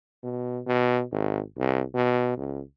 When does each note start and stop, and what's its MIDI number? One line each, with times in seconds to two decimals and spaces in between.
0.24 0.60 47
0.66 1.02 47
1.12 1.41 32
1.57 1.83 36
1.94 2.36 47
2.37 2.61 37